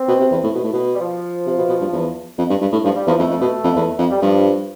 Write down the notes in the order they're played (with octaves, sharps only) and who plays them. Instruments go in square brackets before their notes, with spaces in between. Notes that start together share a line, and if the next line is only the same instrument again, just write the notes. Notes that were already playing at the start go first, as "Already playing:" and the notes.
Already playing: [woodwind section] C4
[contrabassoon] B2
C3
E2
A2
B2
A2
B2
[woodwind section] G3
F3
[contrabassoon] C3
B2
B2
G2
E2
F2
G2
G2
A2
[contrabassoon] G2 [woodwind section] F3
[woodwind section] G3
[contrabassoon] E2 [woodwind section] F3
[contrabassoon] F2 [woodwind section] A3
[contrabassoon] F2
B2
F2
E2
F2
[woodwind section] G3
[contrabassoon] G2 [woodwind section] F3